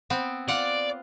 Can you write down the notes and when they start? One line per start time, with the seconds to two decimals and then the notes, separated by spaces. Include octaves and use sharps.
0.10 B3 C4
0.48 F4 D5 F#5